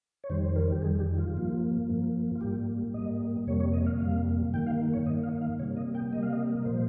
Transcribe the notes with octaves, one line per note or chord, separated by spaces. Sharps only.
C#5
F2 D#3 G3 C5
C5
A#4
G4
F2 D#3 G3 G#4
G4
F4
G2 F3 A#3
G2 F3 A#3
F4
G#2 G3 A#3 G4
G#2 G3 A#3 D#5
F2 C3 G3 A#3 C#5
C#5
D#5
F5
F2 C3 G3 A#3 F5
G2 D#3 A#3 G5
F5
C#5
G2 D#3 A#3 D#5
F5
F5
C3 G3 A#3 C#5
D#5
G5
C3 G3 A#3 D#5
F5
D#5
A#4
A#2 F3 A#3 C5